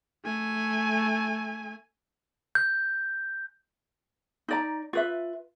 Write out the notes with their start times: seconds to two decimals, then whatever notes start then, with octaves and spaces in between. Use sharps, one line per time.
0.25 A3 G#5
2.55 G6
4.48 D#4 D5 A#5
4.93 F4 B4 E5